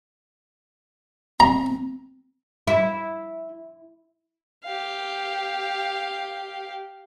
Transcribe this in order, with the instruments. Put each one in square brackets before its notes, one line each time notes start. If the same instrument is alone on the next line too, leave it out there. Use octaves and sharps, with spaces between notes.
[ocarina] C4 [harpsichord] A#5
[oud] E4
[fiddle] G4 F5